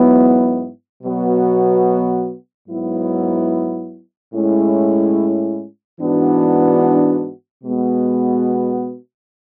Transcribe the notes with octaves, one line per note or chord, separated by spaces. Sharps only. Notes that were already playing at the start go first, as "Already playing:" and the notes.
Already playing: G#2 F#3 B3 E4
B2 F#3 B3 F#4
G#2 F#3 B3 E4
A2 G#3 C#4 E4
G#2 E3 B3 D4 F#4
B2 G#3 B3 F#4